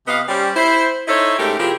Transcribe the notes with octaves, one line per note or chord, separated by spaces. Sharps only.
C3 B3 D#5 F5
G3 C#4 C5
E4 C5
D#4 E4 A4 C5 C#5 D#5
G#2 A3 C#4 G4 A4 A#4
C3 F3 E4 G4 G#4 A#4